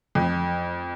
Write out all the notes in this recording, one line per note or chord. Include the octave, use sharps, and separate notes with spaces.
F2